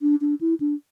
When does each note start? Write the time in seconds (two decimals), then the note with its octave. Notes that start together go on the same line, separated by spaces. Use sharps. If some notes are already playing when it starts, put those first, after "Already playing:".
0.02 D4
0.21 D4
0.41 E4
0.60 D4